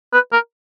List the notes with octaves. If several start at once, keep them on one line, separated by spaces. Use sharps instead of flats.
B4
A#4